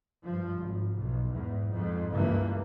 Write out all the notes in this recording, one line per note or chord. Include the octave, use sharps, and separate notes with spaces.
G2 F3
G#1
B1
E2 G#2
F2 G#2
C#2 G2 E3 A#3